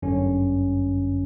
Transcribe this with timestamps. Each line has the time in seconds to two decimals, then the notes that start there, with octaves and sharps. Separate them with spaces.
0.02 G1 F#2 D3 C#4